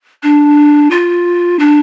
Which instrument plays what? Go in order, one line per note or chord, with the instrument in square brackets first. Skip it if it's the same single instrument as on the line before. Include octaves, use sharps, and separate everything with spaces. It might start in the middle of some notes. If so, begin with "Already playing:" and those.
[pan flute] D4
F4
D4